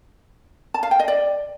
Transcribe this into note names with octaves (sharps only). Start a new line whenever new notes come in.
A5
F5
G5
D#5
D5